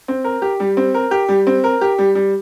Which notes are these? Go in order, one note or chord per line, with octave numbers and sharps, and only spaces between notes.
C4
A#4
G4
G3
C4
A#4
G4
G3
C4
A#4
G4
G3
G3